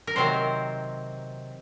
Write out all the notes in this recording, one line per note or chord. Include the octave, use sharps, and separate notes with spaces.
A#4
C3 D#3 F#3 C4 C5